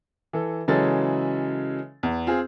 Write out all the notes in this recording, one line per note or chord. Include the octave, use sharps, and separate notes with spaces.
E3 A4
C#3 E3 F#3 G#3 A4 A6
E2
C4 F4 G#4